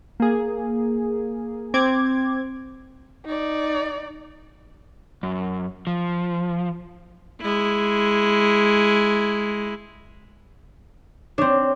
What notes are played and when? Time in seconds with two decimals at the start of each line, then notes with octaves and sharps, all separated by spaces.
0.20 A#3 G#4
1.74 C4 D6 G#6
3.25 D#4 D5
5.23 F#2
5.87 F3
7.42 G#3 E4
11.38 C4 D4 C#5